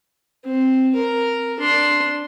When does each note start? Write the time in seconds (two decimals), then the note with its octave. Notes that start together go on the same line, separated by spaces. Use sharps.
0.44 C4
0.95 A#4
1.59 D4 C6